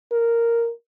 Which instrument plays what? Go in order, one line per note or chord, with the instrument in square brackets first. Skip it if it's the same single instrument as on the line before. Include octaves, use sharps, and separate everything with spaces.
[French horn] A#4